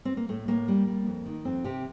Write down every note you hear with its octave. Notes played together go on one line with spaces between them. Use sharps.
C4
A#3
A2 A3
A2 A#3
G3
G3
F2
D#3
F2 C4
C3 G4